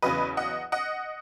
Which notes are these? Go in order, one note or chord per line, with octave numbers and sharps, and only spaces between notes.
E2 C#3 F#3 B4 D#5
D#5 F#5
D#5 F#5